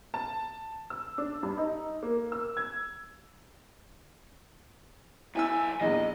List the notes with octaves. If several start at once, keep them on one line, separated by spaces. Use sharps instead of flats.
A5
E6
D4
G2
D#4
A#3
E6
G#6
B1 E4 E5 G#5 E6
A#1 E2 D#5